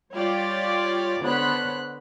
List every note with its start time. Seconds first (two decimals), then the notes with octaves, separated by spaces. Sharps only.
0.14 G3 F4 G4 C#5 D5
1.21 D3 B3 C5 C#5 B5 F#6